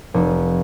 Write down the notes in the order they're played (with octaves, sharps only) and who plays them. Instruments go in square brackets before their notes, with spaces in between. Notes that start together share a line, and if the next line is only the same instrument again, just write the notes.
[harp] F1